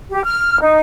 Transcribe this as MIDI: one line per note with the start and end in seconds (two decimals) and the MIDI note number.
0.10 0.24 67
0.24 0.58 89
0.62 0.80 63